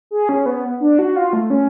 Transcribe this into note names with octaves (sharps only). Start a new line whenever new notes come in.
G#4
C#4
B3
D4
F#4
F4
A3
C#4